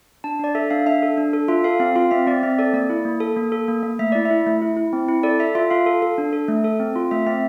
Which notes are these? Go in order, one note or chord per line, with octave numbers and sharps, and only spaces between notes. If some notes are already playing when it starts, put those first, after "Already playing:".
D4 A5
D4 D5
A4 E5
D4 F5
D4 E5
A4
D4
A4
F4 E5
A4 F5
C4 F5
F4 F5
C4 E5
C4 D5
C4 E5
A4 D5
A#3 D5
E4
A#3
A4
A#3
A4
A#3
A#3
A3 E5
E4 D5
E5
E4
A3
E4
E4
C4
E4
A4 D5
A4 E5
F4 E5
F4 F5
A4
A4
D4
A4
A3
A4
C4
F4
A3 E5
C4 E5